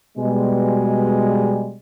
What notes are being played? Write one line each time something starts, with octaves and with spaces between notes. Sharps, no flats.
B2 G3 G#3